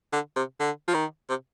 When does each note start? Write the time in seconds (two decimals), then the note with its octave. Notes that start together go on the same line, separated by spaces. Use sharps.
0.12 D3
0.36 C3
0.59 D3
0.88 F3
0.94 D#3
1.29 C3